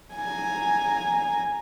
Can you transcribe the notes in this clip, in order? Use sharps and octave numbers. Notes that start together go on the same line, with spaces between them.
G#5 A#5